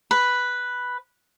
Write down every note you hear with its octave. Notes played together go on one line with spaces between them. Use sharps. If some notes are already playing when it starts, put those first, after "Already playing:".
B4